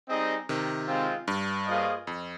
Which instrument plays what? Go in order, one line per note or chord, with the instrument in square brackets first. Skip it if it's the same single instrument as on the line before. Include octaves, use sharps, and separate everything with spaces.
[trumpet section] G3 C4 D#4 G#4 D#5
[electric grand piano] C3 D#3
[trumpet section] G#3 C4 F4
[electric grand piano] G2
[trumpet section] A#3 F4 G#4 C5 D#5
[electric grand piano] F2